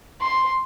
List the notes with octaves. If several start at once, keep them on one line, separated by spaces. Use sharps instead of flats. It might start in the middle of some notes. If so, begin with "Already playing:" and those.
C6